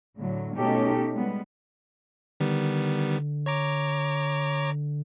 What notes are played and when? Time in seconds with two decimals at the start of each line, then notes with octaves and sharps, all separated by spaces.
0.18 A2 D3 F#3
0.55 B2 A3 C#4 D#4 G4 A4
1.12 G3 G#3 B3
2.40 D3 D#3 G3 B3
3.46 C#5 A#5 D6